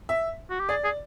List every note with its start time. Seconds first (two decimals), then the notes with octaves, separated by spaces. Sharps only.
0.09 E5
0.50 F#4
0.60 G4
0.69 G#4 D5
0.84 G#4